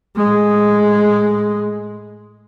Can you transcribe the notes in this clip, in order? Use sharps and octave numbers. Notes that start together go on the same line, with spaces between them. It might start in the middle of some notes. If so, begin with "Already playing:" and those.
A2 G#3